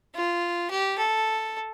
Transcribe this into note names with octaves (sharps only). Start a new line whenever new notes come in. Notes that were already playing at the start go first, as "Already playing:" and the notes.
F4
G4
A4